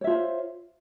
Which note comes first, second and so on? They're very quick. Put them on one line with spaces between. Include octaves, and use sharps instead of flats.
C#5 E5 F4 C5